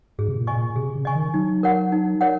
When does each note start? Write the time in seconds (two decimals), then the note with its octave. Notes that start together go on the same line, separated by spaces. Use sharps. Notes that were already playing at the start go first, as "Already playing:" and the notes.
0.18 G#2 G#4
0.29 C3
0.37 A#2
0.47 D#5 G#5 C#6
0.56 A#2
0.76 C3 G#4
0.95 C#3
1.05 D#5 G#5 C#6
1.15 D#3
1.34 F#3 D#4
1.63 A#4 C#5 F#5
1.92 D#4
2.21 A#4 C#5 F#5